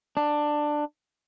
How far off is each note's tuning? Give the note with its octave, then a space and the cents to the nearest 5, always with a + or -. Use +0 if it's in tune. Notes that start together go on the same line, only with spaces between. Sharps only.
D4 +15